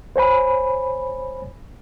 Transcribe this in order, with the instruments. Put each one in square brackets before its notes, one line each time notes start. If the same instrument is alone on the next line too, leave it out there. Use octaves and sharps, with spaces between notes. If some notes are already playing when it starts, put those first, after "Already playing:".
[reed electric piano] C5 C#5 G#5 B5